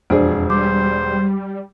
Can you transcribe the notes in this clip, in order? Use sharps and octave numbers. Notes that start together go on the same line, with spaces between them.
E1 F2 D4 G#4 C5 D5
G3 C5 D6